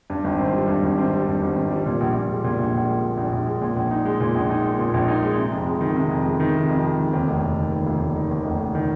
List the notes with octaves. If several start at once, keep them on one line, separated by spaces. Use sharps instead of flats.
G2
G#1
C4
G3
G2
G#1
C4
G3
G2
G#1
C4
G3
A#2
A#1
A#1
G#3
A#2
A#1
A#1
G#3
A#2
A#1
A#1
G#3
A#2
A#1
D#4
G#3
A#2
A#1
D#4
G#3
A#2
A#1
D#4
G#3
C3
F2
G#3
D#3
C3
F2
G#3
D#3
C3
F2
G#3
D#3
D#2
F1
F1
D#3
D#2
F1
F1
D#3
D#2
F1
F1
D#3